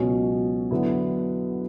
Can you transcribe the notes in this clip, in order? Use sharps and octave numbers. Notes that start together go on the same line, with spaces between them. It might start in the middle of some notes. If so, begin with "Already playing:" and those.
Already playing: C#2 B2 F#3 C#4
D3 F#3 B3 E4